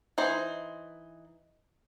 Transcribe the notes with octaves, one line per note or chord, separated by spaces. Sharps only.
E3 D#4 C5